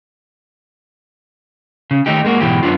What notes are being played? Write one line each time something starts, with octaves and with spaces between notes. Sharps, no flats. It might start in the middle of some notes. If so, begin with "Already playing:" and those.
C#3
D#3 A3 D#4 G4
G#3 A#3 F#4
G#2 B2 E3 G4
F#2 B3 C#4 D4 F4